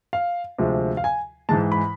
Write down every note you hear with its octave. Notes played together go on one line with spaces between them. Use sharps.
F5
D2 C3 F3 G#3
F5
G#5
G#2 E3 G#3 A5
B5